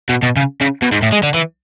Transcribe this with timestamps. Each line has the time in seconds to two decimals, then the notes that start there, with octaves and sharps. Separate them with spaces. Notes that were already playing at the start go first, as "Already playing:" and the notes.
0.09 B2
0.23 B2
0.36 C#3
0.61 C#3
0.82 B2
0.92 G#2
1.02 A2
1.12 G#3
1.23 D3
1.34 E3